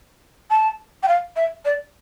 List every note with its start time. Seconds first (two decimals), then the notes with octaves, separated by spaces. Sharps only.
0.50 A5
1.03 G5
1.08 F5
1.36 E5
1.65 D5